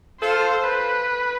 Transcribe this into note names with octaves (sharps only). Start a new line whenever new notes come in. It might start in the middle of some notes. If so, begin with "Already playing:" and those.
F4 A4 C5
B4